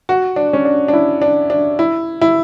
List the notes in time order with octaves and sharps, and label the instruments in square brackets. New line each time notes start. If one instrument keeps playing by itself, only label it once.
[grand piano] F#4
D4
C#4
D4
D4
E4
D4
D4
E4
E4